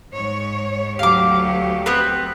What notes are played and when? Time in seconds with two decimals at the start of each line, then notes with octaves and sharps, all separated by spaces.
0.12 G#2 C#5
0.99 D2 F#3 G4 F5 D6
1.86 B3 C4 B4